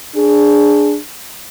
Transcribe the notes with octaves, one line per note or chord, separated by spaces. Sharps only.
D4 G#4